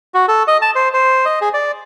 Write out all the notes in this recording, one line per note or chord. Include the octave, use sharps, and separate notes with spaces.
F#4
A4
D#5
A5
C5
C5
D#5
G#4
D5